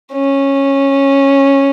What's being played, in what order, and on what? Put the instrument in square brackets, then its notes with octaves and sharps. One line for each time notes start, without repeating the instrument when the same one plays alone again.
[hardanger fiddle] C#4